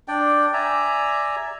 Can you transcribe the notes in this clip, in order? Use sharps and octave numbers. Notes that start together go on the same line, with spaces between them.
D4 D5 G5
D5 E5 G#5 A#5